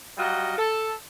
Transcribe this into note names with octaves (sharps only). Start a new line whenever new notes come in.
F#3 G3 F4 F#4 D#5
A4